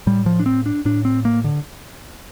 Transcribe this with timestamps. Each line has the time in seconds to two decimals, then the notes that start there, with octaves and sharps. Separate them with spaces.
0.07 A2 G3
0.26 F3
0.39 D4
0.46 C4
0.66 D4
0.85 A2 D4
1.05 C4
1.25 A#3
1.44 D3